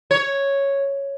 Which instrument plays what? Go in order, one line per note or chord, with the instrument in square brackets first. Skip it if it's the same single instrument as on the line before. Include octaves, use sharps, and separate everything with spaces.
[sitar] C#5